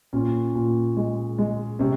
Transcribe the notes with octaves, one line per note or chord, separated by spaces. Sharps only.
A#2 C#4
A#2
G#3
G#3
C3 C#4